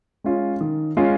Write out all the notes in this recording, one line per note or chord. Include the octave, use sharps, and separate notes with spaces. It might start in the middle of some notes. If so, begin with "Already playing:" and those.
G#3 C#4 F4
D#3
G#3 C#4 F4